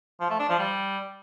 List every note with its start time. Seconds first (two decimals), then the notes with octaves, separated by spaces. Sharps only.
0.20 F3
0.30 A3
0.40 D4
0.49 F3
0.59 G3